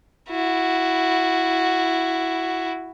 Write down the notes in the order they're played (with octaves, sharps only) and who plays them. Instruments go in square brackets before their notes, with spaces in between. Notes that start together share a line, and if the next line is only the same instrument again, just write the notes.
[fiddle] E4 F#4